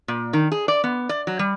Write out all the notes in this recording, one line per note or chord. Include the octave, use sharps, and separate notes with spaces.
A#2
D#3
G#4
D5
B3
D5
F#3
G3